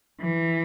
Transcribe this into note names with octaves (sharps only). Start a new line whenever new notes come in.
E3